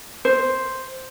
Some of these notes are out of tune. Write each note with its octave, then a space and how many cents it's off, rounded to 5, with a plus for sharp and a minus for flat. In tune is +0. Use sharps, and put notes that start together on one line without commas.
C5 +0